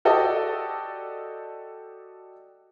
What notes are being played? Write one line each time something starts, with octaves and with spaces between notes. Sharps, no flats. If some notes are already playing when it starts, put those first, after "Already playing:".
F#4 G4 A4 D5 D#5